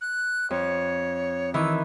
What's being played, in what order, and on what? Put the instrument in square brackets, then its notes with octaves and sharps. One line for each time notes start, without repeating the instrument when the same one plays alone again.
[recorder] F#6
[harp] F2 [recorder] C#5
[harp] D#3 E3 [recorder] E6